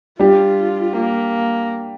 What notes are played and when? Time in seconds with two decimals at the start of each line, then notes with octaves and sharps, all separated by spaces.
0.19 G3 D4 F4 G4
0.93 A#3